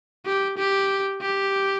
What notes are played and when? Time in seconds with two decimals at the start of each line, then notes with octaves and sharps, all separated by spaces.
0.25 G4
0.57 G4
1.21 G4